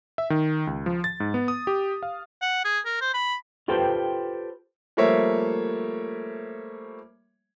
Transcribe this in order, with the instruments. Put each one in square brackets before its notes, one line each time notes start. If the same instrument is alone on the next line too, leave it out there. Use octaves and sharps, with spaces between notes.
[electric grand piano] E5
D#3
C#2
F3
A6
G#2
B3
D#6
G4
F5
[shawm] F#5
G#4
A#4
C5
B5
[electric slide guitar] F4 G4 A4 B4 C5 G5
[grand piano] F3 G3 A3 A#3 C#5 E5